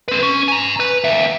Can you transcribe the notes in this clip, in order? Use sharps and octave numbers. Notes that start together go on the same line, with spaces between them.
C4 B4
C#4
G#5 A#5
B4
D#2 E5